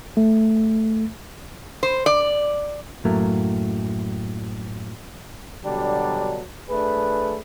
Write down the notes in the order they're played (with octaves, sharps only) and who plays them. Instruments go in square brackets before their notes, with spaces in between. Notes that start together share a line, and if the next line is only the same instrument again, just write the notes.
[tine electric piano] A3
[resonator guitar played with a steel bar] C5
D5
[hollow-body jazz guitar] F#2 A2 F#3 A3 A#3
[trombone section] B2 D3 F#3 G3 D4
A3 D4 G#4 B4